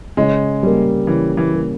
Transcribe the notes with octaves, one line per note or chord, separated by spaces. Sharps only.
C#3 G#3
G3 A#3
C#3 E3
E3
G3 A#3